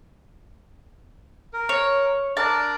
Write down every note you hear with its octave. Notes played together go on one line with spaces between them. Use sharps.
A#4
C#5
D4 A#4 D5 A5